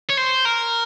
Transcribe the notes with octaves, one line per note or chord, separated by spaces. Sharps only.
C#5
C5
A#4